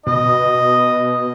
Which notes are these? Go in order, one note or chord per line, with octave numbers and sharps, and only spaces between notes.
B2 D#5